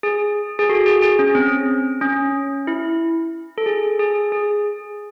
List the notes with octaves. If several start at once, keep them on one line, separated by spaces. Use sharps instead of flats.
G#4
G#4
F#4 A4
G#4
G#4
C#4
C4
C#4
E4
A4
G#4
G#4
G#4